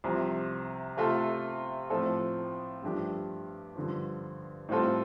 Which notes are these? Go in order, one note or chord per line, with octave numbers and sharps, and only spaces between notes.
C2 C3 F3
C3 A3 F4 A4
A2 F3 C4 F4 A4
G2 F3 A3 D4 G4
G2 D3 F3
A2 G3 C4 F4 A4